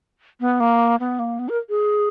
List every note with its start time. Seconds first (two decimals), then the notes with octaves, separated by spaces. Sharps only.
0.41 B3
0.60 A#3
1.00 B3
1.19 A#3
1.39 B3
1.49 A#4
1.70 G#4